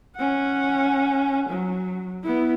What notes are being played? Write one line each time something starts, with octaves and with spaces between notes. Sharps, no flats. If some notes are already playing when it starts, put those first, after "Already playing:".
C#4 F#5
F#3
B3 E4